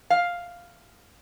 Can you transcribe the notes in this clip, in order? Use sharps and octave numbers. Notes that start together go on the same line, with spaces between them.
F5